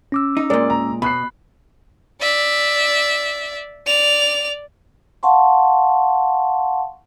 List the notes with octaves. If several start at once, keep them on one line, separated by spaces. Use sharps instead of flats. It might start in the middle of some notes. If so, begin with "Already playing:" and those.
C#4 D6 E6
D#4
A#2 G#3 A#4 D5
A#5
B2 B5 F#6 C7
D5 E5
D5 F7
F5 F#5 A5 C6 C#6